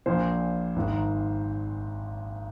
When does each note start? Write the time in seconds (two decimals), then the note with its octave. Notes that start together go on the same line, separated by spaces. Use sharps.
0.06 A#1 A#2 C5
0.76 G#1 G#2 D#3